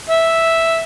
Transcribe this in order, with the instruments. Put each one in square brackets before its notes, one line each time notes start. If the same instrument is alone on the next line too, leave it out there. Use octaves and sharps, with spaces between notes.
[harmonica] E5